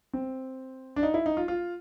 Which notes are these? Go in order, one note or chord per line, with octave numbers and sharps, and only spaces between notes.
C4
D4
D#4
E4
D#4
F4
F4